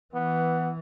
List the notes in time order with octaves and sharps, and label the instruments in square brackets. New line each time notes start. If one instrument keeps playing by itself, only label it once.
[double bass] E3 [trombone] B3